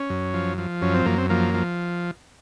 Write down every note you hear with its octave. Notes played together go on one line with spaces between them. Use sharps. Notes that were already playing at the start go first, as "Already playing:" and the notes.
Already playing: C#4
F#2
F3
F3
F#2 C#4
C4
F#2 A#3
C4
F3 A#3
F3